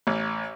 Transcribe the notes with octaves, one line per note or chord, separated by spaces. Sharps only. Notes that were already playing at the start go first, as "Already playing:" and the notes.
A1